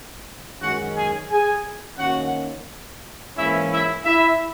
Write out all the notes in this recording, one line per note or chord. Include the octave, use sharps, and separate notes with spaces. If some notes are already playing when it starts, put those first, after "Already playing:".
F#2 D#3 G#3 C#4 F#4 F#5
G#4 G#5
G#4 G#5
D#3 A#3 C#4 F#4 F#5
G#2 E3 A#3 C#4 E4 E5
E4 E5
E4 E5